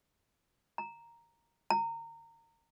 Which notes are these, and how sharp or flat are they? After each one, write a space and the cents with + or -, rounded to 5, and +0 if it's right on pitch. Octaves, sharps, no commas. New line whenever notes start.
A#5 +0
A#5 -25